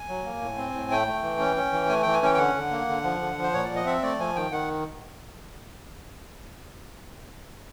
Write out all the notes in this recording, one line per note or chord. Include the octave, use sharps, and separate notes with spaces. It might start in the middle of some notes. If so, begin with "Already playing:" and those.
Already playing: G#5
F#3
A#3
A2
C4
A2
A3 G5
A3
E3
C#4
C#4
E3
A3 G#5
E3 G5
G#5
C#4 G5
G5
D3 F#5
D3
A#3
D3
F3
D3
F3
C5
A#2 C#5
D5
F3
D#5
C4 E5
A3 D5
F3 G#5
D#3 G5
D#3 F#5